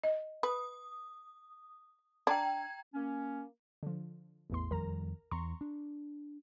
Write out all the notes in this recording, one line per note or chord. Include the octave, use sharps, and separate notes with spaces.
D#5
B4 D#6
D4 G5 A#5 G#6
A#3 C#4
D3 F3
A1 E2 C6
F2 D#3 G3 A#4 A#5
E2 A#5 C6 C#6
D4